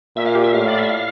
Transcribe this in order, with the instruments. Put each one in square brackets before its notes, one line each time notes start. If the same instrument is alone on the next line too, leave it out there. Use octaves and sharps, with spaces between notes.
[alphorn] A#2 [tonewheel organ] E5
[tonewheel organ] F5
G4
E5
[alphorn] A2 [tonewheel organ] F5
[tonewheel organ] D5
E5
F5